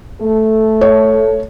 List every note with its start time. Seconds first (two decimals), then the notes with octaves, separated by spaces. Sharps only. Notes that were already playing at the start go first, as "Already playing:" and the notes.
0.21 A3 A4
0.81 C#5